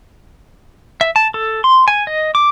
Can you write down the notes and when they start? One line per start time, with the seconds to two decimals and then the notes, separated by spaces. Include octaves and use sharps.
1.01 E5
1.16 A5
1.34 A4
1.64 C6
1.88 G#5
2.07 D#5
2.35 D6